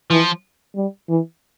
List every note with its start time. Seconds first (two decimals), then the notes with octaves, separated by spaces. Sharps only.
0.10 E3 F3
0.76 G3
1.09 E3